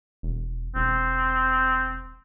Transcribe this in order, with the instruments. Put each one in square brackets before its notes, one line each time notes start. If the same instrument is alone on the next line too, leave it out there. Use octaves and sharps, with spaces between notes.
[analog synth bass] E1
[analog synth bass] E1 [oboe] C4